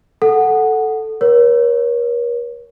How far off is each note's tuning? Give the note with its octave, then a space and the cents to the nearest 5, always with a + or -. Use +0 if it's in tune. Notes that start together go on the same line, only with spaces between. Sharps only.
A4 +0 F#5 +0
A#4 +40 C#5 +0